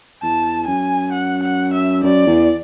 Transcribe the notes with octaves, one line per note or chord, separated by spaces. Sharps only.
E2 A5
F#2 G#5
F#5
F#5
E5
F#2 D5
E2